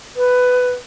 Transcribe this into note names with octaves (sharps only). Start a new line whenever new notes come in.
B4